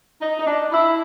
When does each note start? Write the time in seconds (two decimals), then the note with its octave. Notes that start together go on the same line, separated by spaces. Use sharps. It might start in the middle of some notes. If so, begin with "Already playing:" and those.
0.20 D#4
0.39 D#4
0.45 D4
0.71 E4